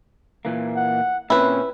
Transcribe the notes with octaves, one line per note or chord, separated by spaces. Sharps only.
A#2 E3 A#3
F#5
A#2 C4 C#4 E4 B4